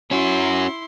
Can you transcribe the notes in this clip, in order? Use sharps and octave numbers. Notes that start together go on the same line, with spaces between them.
C#4 E4 F#4 C6